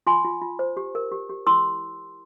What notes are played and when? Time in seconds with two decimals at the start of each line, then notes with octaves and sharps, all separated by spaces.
0.07 F4 G#5 C6
0.25 F4
0.42 F4
0.59 C5
0.77 G4
0.95 A#4
1.12 G4
1.29 G4
1.47 E4 C6 E6